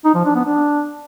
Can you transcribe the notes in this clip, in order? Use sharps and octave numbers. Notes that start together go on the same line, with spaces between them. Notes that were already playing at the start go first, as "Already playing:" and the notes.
D#4
F3
D4
B3
D4